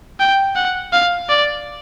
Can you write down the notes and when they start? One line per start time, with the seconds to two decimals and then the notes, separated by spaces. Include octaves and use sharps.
0.20 G5
0.56 F#5
0.92 F5
1.29 D5